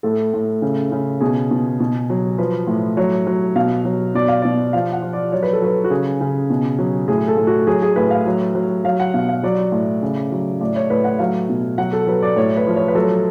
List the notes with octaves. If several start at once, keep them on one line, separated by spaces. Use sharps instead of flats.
A2 A4
A2
C#3
C#3
B2 G#4
B2
B2
F#3
F3 B4
A2
F#3 C#5
F#3
B2 F5
F#3
B2 D5
F5
B2 D5
F3 F5
F#5
F3
D5
F#3 C#5
B4
A4
F#3 B4
F#4
C#3 G#4
C#3
B2
F#3
A2 G#4
A4
A2
F#4
F#3 G#4
G#4
A2 B4
F5
F#3
F#3
F#3 F5
F#5
B2 F5
F5
F#3 D5
A2
C#3
F#3
A2 D5
C#5
A2 B4
F#5
F#3 F5
B2
F#3 F#5
A4
F#3 B4
D5
A2 C#5
B4
F3
C#5
B4
F#3 A4